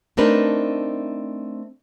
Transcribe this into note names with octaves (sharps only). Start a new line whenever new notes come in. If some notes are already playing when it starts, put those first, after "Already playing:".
A3 C4 D4 D#4 A#4 B4